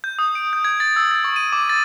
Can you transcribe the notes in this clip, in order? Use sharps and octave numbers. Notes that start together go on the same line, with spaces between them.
G6
D#6
D7
G6
G#6
A6
E6
A6
C#6
D#7
D6
A6